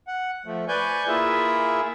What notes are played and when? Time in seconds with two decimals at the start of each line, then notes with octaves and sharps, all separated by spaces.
0.08 F#5
0.45 F3 A3
0.68 B4 D5 G#5 C#6 G6
1.08 A#3 E4 F4 G#4 E5